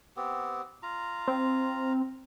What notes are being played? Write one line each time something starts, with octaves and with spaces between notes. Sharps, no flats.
B3 C4 G4
F4 A#5
C4